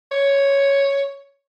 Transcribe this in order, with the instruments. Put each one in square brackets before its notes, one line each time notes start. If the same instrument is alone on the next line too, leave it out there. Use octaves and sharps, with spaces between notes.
[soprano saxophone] C#5